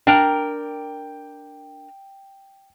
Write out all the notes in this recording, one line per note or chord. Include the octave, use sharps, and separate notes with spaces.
D4 A#4 G5 A#5